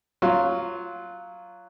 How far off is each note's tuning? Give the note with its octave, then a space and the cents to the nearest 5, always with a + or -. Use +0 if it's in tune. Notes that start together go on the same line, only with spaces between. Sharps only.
F#3 +0 F4 +0